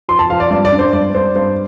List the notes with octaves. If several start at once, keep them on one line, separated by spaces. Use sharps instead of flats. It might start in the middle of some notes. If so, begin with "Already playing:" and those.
F3 C6
A5
F3 F5
D5
G2 D5
D5
D4
C5
G2 D5
G2 C5
G2 C5